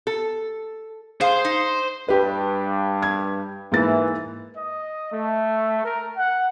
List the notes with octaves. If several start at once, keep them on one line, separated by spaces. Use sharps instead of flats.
A4
G#4 C5 F5 C6
D#4
G2 G4 B4
G#6
G#2 E3 A#3 A6
D#5
A3
A#4
F#5